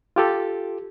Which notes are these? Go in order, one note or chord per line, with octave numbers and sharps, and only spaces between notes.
F4 G4 A4